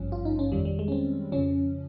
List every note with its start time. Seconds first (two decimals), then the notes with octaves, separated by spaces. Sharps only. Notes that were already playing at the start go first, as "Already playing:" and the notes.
Already playing: G#1 G2 F3 C#4
0.12 F4
0.25 D#4
0.39 C#4
0.52 F2 D#3 G3
0.65 G3
0.79 G#3
0.88 C#4
0.92 C4
1.32 F2 C#3 F3 C#4